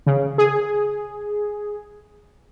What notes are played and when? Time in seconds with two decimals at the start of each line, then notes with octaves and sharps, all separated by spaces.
0.07 C#3
0.38 G#4